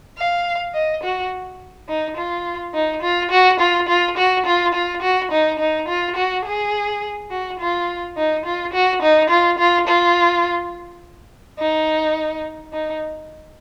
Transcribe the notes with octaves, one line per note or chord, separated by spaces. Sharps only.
F5
D#5
F#4
D#4
F4
D#4
F4
F#4
F4
F4
F#4
F4
F4
F#4
D#4
D#4
F4
F#4
G#4
F#4
F4
D#4
F4
F#4
D#4
F4
F4
F4
D#4
D#4